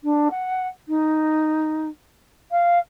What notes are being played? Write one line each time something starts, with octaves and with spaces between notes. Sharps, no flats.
D4
F#5
D#4
F5